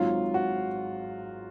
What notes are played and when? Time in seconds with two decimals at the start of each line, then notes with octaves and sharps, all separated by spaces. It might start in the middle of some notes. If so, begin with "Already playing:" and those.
Already playing: G#1 G#2 F#3 F4
0.34 F#4